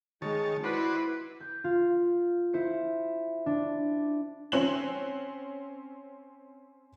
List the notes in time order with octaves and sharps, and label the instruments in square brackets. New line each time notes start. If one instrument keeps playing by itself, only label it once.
[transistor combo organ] D#3 C#5 A5 [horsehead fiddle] G#3
[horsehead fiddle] E4 [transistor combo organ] F#4 C5 D5 [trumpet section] B4
[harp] G6
F4
E4 C5 C#7
D4
[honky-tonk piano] C4 C#4 F#6 F#7